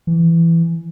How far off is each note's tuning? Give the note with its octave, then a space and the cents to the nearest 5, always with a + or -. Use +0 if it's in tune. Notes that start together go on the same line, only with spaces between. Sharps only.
E3 +15